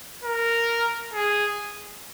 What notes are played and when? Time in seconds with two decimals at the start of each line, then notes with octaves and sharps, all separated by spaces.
0.24 A#4
1.14 G#4